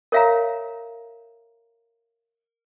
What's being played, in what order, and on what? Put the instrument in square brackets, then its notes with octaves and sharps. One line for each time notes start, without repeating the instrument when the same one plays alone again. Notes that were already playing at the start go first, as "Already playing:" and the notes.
[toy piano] A#4 C#5 E5 F5 A#5